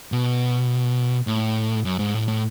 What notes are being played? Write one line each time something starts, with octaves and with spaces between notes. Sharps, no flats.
B2
A2
F#2
G#2
A2
A2